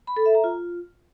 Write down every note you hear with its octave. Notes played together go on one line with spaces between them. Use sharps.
B5
A4
E5
A#5
F4